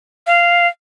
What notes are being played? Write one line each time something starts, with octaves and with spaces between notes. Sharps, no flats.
F5